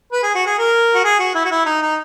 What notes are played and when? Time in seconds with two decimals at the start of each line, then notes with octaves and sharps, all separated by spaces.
0.12 B4
0.23 G#4
0.35 F#4
0.46 G#4
0.59 A#4
0.94 F#4
1.04 G#4
1.20 F#4
1.35 E4
1.45 F#4
1.51 E4
1.66 D#4
1.82 D#4